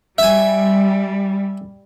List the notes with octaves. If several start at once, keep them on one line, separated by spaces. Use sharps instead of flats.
G3 E5 G#5